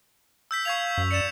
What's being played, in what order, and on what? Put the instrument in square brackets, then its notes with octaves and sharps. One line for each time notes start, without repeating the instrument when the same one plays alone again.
[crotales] E6 G6 B6
[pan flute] F5 [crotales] C#6 G#6 F7
[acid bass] F#2
[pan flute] D5 [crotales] C#7 E7